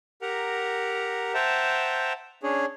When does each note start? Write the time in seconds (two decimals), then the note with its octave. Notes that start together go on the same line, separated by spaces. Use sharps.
0.22 G4 A#4 F#5 A#5
1.34 C5 E5 F#5 G5 A5 A#5
2.43 C#4 D4 G#4 C#5